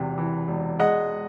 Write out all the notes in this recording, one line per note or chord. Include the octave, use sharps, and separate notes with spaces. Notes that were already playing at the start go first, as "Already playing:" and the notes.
Already playing: E1 E2 C3 E3
E3
E1
G#3 D#5 F#5